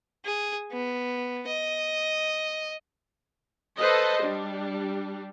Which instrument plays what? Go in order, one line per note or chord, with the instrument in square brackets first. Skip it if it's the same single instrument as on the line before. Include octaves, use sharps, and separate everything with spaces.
[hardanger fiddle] G#4
B3
D#5
[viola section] A4 B4 C5 D#5
G3 D4